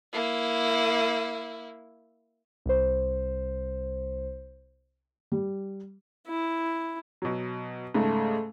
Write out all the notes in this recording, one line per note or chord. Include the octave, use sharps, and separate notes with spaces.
A#3 E4
C2 C5
G3
E4
B2 F#3
G#2 C#3 A3